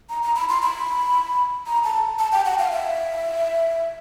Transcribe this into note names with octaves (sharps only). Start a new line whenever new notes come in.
A#5
A#5
B5
C6
B5
A#5
A5
A5
G5
F#5
F5
E5